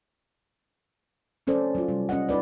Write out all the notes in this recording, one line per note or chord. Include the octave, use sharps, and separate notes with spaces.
F#3 C#4 A4 C5 D5
F#3 F4
C3 G3
C#4 D#5 F#5
D#4 F4 B4 D5